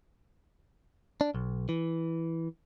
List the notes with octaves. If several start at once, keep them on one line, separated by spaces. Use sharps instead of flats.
D4
B1
E3